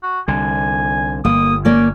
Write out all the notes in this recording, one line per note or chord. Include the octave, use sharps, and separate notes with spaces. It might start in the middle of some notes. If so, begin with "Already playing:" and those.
F#4
C2 D3 G#5
G1 A#3 D#6
A#3 C#4 D5